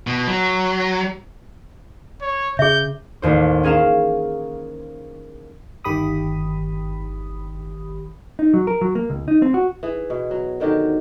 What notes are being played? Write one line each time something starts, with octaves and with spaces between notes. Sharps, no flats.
B2
F#3
C#5
C#3 G#4 E5 G6
A1 D#2 C5
C#4 G#4 A#4 F5 E7
G1 D#3 G4 B5 D#6
D#4
F#3
A#4
F#3
A#3
C#2
D#4
C4
F#4
E3 G#4
B2
F#3
D3 D#3 F#3 G4